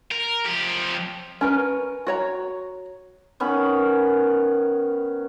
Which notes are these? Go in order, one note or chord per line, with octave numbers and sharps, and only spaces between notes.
A#4
F3 G4
C#4 A#4 B4
F#4 C#5 A#5
D#3 B3 C#4 B5